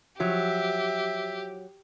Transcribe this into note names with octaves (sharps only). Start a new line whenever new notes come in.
F3 F#3 G4 E5